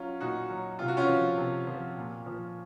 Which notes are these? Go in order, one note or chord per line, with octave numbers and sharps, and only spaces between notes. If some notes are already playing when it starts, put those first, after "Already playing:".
Already playing: F#3 C#4 F4
A#2 D#4 F#4
F#3
C3 F4
F#4
C#4 F4
F3
C3
F3
A#2
F3